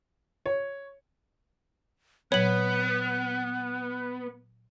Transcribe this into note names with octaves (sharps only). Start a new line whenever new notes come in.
C#5
A#2 F#3 B3 C#5 B5 F#6 F#7